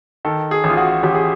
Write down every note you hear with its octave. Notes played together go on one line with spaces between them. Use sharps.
D#3 A4
G#4
A1
F4
F#4
A1 G4
G#4